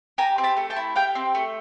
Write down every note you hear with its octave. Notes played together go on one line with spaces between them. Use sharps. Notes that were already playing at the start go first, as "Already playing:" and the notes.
G4 G#5 A#5
C4
A5 B5
A3
G5 A5
E4
G4 F5 G5
C4
A3